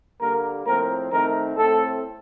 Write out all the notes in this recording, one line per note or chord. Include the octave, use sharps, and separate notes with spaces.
D3 G3 A#3 A#4
A2 F3 C4 A#4
D#3 A3 C4 A#4
A2 A3 C4 A4